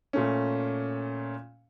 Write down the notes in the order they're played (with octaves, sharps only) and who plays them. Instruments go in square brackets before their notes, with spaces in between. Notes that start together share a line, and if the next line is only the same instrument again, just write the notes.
[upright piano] A#2 A3 C#4